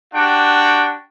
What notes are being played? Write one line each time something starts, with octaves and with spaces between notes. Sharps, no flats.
D4 F#4 G4 G5